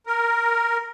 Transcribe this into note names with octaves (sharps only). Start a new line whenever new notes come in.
A#4